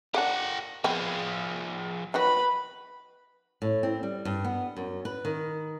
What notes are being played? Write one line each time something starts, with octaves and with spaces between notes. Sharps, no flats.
A#3 D4 G4 F#5
F3 B3 C4 G#4
D#3 F#3 F#4 B4 B5
A2
C4
G3
G2
B3
F#2
B4
D#3